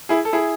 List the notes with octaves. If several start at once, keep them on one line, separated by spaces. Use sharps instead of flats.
E4 G#4
A4
E4 G#4